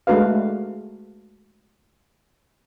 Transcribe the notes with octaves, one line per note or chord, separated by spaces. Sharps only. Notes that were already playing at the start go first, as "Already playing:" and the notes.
G#3 A3 D4 F#4 B4 F5